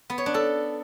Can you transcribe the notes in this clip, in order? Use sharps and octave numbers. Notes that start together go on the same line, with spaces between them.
B3
C#5
D4
A4